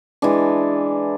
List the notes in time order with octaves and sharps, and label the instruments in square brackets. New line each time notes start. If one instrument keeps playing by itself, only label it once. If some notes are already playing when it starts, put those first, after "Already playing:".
[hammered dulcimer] E3 G#3 D4